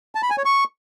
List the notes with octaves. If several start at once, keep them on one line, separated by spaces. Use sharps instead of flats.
A5
B5
G#5
C#5
C#6